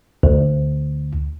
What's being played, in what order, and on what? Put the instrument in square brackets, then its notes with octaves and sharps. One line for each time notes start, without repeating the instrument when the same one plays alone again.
[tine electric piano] D2